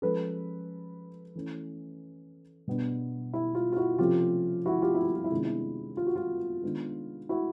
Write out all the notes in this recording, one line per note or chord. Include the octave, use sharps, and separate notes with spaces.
F3 G#3 C#4 A4 B4
E3 A3 C#4
B2 G3 B3 D4
E4
F4
F4
E4 F#4
C3 F3 A3 C#4 F4 G4
E4 F#4
F4 G4
E4
F4
F4
E4
C3 D#3 G#3 B3 D4
E4
F4
F#4
F4
D#3 G#3 B3 D4
E4 F#4